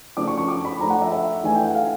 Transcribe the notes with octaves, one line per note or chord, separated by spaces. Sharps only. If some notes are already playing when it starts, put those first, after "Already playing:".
C#3 F3 A3 D4 D6
C#6
C#6
D6
B5
F3 A3 D4 A#5
F#5
E5
E5
E3 A3 D4 G#5
G5
F#5
F5